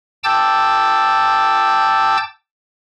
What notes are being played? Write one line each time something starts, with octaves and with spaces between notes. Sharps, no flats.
G5 A5 D6 E6 G6 A6